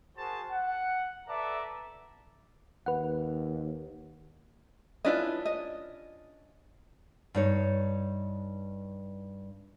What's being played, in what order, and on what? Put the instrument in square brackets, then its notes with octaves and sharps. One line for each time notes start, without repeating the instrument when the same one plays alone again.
[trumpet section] F#4 G#4 A#4 C5 A5
F#5
A4 B4 D5 E5 A5 A#5
[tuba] D#2 [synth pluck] B4 F#5
[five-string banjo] C#4 D4 F4 [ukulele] E4 B4 D#5
[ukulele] D#5
[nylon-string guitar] G2 D#4 C#5